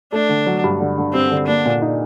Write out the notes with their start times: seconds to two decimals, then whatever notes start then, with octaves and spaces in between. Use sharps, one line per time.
0.12 A3 D4
0.29 D3
0.47 F#3
0.64 G2
0.80 D3
0.98 D3
1.14 G2 C4
1.32 D3
1.47 A#3 D4
1.65 A#2
1.82 D#4